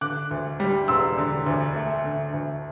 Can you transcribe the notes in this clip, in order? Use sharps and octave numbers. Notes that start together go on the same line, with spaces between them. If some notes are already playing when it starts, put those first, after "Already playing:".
D3 D6 F#6
D2
G3
E1 C6 E6
D3
D2
A3
D3
D2